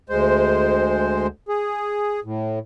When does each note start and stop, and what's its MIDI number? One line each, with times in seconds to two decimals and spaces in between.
0.09 1.27 38
0.09 1.27 56
0.09 1.27 72
1.49 2.20 68
2.24 2.59 45